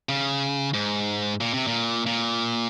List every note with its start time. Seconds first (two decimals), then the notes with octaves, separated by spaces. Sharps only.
0.09 C#3
0.74 G#2
1.41 A#2
1.54 C3
1.67 A#2
2.06 A#2